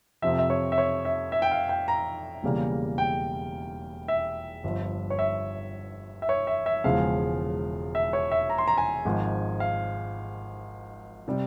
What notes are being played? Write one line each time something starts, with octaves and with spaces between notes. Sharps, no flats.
F2 C3 F3 E5
E5
C#5
E5
C#5
E5
E5
G5
F5
G5
A#5
E1 E2 C#3 G3 A#3
G5
E5
G1 G2 F3
C#5
E5
E5
C#5
E5
E5
E1 E2 C#3 F3 G#3 F5
E5
C#5
E5
A#5
C6
A#5
G#5
G#1 G#2 F3
F5
C3 G3